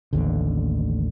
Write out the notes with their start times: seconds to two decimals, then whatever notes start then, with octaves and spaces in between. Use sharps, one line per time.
0.13 A1 D#2 D3